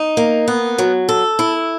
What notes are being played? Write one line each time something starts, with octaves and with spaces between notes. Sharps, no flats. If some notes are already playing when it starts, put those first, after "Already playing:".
Already playing: D#4
A#3
B3
F#3
A4
E4